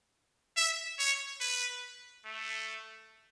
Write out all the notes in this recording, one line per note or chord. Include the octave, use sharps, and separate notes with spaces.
E5
C#5
B4
A3